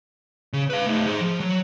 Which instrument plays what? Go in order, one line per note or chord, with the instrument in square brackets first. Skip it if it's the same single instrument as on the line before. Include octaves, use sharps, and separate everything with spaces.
[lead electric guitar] C#3
B4 F5
A3 D#4
G#4 C5
F3
F#3